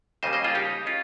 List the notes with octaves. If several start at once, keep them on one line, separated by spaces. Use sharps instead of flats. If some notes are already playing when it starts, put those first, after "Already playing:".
D#2 C#3 G3 A#3 C5 D#5
C5 D#5
F4 G#4
D#4 G4
C#4 F4